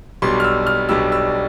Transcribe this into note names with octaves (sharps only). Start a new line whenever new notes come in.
B1 B2 G3 D4 C6
F6
E6
F6
B1 B2 G3 D4 E6
E6